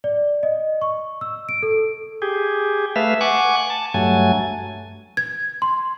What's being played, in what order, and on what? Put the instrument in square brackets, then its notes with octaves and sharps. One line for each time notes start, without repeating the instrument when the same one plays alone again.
[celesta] D5
D#5
C#6
E6
D7
A4
[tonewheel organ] G4 G#4
A3 B4 E5 F5
F#5 G#5 C#6 D6
A5
G2 F#3 A3 G#5
[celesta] G#6
C6